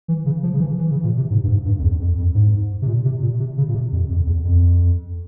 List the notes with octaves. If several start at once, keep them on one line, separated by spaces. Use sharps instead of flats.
E3
C#3
F3
C#3
E3
E3
C#3
A#2
C3
G#2
G2
G#2
G2
F2
E2
F2
F2
G#2
C3
A#2
C3
A#2
C3
C#3
A#2
C3
F2
F2
E2
F2